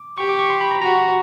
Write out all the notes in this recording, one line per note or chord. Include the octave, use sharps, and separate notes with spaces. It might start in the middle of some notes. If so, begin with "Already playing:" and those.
Already playing: D6
G4 C#6
D6
C#6
C6
B5
A#5
F#4 A#5